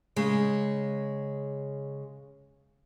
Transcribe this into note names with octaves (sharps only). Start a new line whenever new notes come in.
C#3 G#3